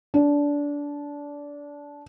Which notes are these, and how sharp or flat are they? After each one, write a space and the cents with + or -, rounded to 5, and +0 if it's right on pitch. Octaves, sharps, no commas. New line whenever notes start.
D4 -20